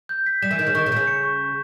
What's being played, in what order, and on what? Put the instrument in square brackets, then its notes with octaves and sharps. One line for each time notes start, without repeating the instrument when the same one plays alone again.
[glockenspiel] G6
B6
[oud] G3 [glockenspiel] E7
[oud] E3
[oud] D#3 [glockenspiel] G6
[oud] C#3
[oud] D#3 [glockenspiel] C#6
[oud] C#3
[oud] B2 [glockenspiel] G6
[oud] C#3
[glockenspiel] C#7
C#6
C#6